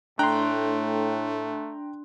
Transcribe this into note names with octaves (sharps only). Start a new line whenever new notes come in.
A2 A3 D4 G5 A#5 C6 F#6